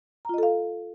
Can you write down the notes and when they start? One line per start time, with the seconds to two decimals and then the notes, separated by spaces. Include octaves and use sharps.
0.25 A#5
0.29 F4
0.34 D#5
0.38 A4
0.43 F5